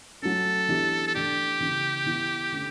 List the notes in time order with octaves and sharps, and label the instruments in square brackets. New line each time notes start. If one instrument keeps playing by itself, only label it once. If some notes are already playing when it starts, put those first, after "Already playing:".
[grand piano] F#3 A3 C#4 [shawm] A4
[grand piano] E3 B3 D4 G4
[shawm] A4
[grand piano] E3 A3 D4 [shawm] G4
[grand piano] C#3 E3 B3
E3 B3 E4
D3 A3 C#4